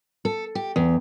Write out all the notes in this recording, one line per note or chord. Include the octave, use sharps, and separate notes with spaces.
A4
G4
E2